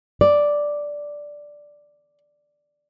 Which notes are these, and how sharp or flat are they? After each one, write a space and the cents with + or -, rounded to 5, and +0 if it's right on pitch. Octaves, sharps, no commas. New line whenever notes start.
D5 +0